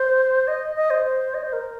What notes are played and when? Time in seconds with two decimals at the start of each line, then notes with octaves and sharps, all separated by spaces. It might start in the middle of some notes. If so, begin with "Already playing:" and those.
Already playing: C5
0.48 D#5
0.76 D#5
0.90 C5
1.05 C5
1.34 D#5
1.43 C5
1.53 A#4